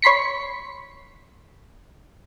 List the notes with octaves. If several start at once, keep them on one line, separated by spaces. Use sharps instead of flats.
C#5 B5 C6 B6 C#7